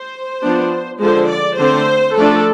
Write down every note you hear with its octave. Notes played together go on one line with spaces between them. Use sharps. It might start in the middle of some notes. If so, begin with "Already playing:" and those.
Already playing: C5
F3 B3 D4
D3 F3 G#3 C5
D5
D3 A3 C4 C5
F3 A3 D4 A4